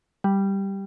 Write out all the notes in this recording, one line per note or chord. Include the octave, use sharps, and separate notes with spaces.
G3